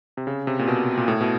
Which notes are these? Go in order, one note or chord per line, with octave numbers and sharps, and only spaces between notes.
C3
C#3
C3
A#2
B2
A#2
A2
B2